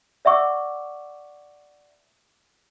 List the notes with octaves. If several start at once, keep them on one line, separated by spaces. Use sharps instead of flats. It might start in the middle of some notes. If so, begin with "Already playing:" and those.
D5 E5 F#5 C#6 D6 E6